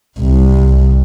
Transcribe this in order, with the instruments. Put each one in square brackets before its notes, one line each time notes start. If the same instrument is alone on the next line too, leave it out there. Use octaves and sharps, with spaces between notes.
[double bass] C2